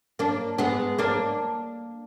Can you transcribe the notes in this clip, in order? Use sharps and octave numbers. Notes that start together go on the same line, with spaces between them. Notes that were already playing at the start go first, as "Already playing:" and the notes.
A#3 D4
G#3 B3
A#3 D4